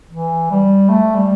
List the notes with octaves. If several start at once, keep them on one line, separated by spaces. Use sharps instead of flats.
E3
G3
A3
G3